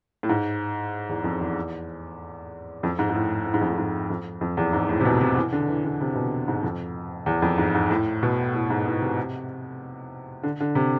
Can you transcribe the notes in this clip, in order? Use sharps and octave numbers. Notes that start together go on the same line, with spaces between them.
A2
G#2
E2
F2
E2
F2
G#2
G#2
A2
A2
G#2
F2
G#2
G#2
F2
F2
E2
G#2
A2
C3
B2
C3
E3
D3
E3
D3
C3
B2
G#2
F2
E2
F2
G#2
G#2
A2
B2
A2
G#2
A2
C3
D3
D3
C3